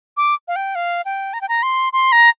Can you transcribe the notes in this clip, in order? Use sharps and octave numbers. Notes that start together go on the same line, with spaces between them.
D6
F5
G5
F5
G5
A#5
G5
A#5
C6
C6
A#5